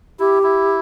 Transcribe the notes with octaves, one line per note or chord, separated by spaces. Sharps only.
E4 G4
E4